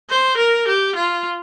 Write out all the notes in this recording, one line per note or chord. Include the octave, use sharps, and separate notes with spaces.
C5
A#4
G4
F4